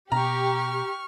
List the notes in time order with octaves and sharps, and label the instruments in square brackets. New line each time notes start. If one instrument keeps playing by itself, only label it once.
[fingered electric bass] B2 [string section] G4 [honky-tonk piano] A#5 [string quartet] C#6 F6